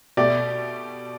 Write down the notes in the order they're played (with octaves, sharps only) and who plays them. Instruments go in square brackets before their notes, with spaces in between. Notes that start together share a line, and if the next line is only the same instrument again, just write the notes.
[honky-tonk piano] B2 A3 G4 [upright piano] D5